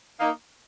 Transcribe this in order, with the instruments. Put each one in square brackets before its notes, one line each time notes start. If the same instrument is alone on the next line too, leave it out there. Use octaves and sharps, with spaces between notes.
[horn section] A#3 D#4